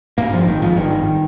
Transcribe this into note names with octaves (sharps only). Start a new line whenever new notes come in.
G2 A#3
G2 F3
G#1 D#3
G#1 F3
G2 D#3
G#1